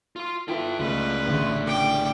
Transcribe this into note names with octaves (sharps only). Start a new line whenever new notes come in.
F4 C6
E4 F4 A4 B4 G5
C#2 G3 A3 B4
A1 D3
G5 D6